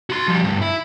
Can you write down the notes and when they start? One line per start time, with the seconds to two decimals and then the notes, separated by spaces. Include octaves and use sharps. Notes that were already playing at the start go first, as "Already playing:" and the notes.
0.10 F#4 C6
0.28 F3 G3
0.44 D2 G2
0.62 E4